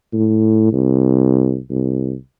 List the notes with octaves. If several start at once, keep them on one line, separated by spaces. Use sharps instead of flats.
A2
C2
C2